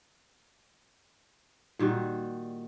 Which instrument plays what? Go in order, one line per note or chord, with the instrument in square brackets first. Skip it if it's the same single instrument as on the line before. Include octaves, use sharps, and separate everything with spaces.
[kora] A#2 D#3 G3 F#4